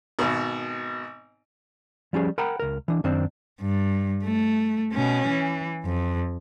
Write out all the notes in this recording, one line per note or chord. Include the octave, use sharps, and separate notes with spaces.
G#1 B2
F3 G3 C#4 G#4
A#4 F#5 G5 A#5 B5
C#2 A#4
E3 D4
F#2 D#3 C4 D4
G2
A3
B2 C#4
E3
F2